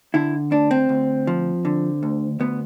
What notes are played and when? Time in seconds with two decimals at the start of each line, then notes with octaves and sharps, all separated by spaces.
0.14 D3 E4
0.51 D2 D4
0.71 C4
0.89 D2
1.27 F3
1.65 D3
2.03 D2
2.40 D2 B3